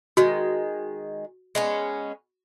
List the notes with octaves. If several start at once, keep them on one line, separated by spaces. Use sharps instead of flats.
D#3 G#3 F#4
G#3 B3 C#4